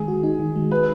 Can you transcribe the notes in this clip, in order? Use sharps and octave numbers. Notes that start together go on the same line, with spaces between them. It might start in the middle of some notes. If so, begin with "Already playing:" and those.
Already playing: D#3 G#3 G#4
F#4
D#4
D#3
G#3
B4